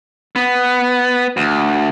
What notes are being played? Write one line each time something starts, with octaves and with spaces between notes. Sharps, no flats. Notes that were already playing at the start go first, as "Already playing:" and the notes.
B3
D2